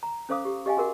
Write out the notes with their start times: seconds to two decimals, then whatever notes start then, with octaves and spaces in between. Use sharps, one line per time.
0.03 A#5
0.29 C#4 A4 C5 F5 D6 D#6
0.45 G4
0.66 G4 D#5 F5 G5 G#5
0.77 F#4 G#4 A#4 F#5